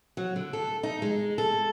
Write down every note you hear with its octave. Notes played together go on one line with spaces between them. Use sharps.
F#3
D3
A4
D#4
G#3
A4